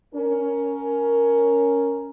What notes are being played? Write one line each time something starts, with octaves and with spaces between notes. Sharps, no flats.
C#4 A#4